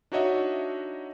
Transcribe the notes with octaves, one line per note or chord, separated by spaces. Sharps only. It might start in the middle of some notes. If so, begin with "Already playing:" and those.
D4 D#4 F#4 C#5 D#5 E5